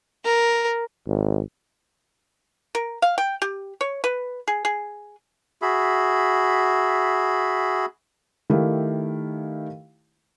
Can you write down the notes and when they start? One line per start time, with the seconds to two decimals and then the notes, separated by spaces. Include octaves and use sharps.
0.25 A#4
1.07 G#1
2.75 A#4
3.02 F5
3.18 G5
3.42 G4
3.81 C#5
4.04 B4
4.48 G#4
4.65 G#4
5.62 F#4 G#4 E5 B5
8.50 D#3 A3 E4 G4 F5